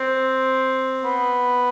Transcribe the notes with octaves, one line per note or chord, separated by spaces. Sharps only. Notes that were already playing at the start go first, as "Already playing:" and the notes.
Already playing: C4
B3